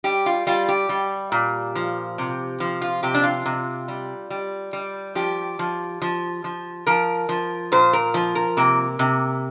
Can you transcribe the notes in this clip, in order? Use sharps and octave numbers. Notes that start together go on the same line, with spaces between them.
G3 G4
F4
G3 F4
G4
G3
A#2
F3
C3
F3
F4
C3 G4
D4
F4
C3
G3
G3
G3
F3 G4
F3
F3
F3
F3 A#4
F3
A#2 C5
A#4
F3
A#4
C3 A#3
C3